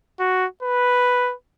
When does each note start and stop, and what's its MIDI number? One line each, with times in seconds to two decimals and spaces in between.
0.20 0.46 66
0.63 1.34 71